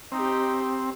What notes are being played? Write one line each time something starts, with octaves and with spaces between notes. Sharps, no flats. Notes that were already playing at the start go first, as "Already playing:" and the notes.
C4 D#4 G4